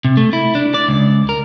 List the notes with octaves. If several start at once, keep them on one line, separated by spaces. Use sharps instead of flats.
C3
A3
E4
D4
D5
C#2
A#4